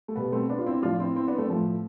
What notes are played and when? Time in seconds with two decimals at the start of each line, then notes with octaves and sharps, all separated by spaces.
0.08 A3
0.16 B2 G3 B3
0.32 A3 C4
0.49 B3 D4
0.59 F4
0.66 C4 E4
0.82 A2 F3 D4 F4
1.00 C4 E4
1.16 C4 E4
1.27 B3 D4
1.38 A3 C4
1.49 A2 F3 A3